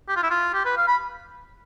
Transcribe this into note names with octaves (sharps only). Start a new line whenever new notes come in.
G4
F4
E4
F4
G4
B4
F5
B5